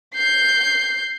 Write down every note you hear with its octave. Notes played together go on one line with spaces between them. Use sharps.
G6 C7